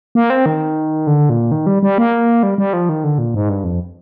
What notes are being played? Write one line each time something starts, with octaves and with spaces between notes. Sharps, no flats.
A#3
C4
D#3
D3
A#2
D#3
G3
G3
A#3
G3
G3
F3
D#3
D3
A#2
G#2
G2
F2